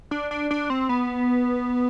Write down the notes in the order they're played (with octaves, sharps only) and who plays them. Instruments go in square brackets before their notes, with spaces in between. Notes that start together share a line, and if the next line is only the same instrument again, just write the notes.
[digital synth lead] D4
D4
D4
C4
B3